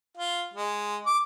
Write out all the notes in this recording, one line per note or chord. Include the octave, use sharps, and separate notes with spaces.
F4
G#3
D6